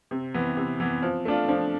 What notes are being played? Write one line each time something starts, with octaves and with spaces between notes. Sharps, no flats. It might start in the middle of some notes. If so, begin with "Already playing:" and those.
C3 C4
E3 B3
C3 C4
E3 B3
F3
A3 D4 F4
F3 D4